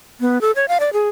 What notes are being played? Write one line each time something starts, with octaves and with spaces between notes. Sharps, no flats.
B3
A4
C#5
F5
D5
G#4